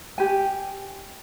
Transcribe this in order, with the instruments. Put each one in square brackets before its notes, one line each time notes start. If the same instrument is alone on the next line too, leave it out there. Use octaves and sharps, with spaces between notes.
[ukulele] G4 G#5